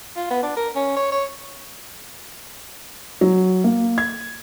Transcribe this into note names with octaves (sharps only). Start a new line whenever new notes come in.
F4
B3
D4
A#4
C#4
C#5
C#5
F#3
A#3
G#6